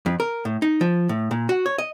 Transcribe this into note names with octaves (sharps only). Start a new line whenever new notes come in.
F2
A#4
A2
D#4
F3
A2
A#2
F#4
C#5
D#5